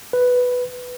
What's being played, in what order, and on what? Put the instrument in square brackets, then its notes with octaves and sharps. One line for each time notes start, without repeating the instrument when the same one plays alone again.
[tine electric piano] B4